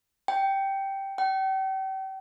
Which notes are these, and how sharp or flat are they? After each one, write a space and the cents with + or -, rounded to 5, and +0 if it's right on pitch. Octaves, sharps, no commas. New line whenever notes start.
G5 -5
G5 -40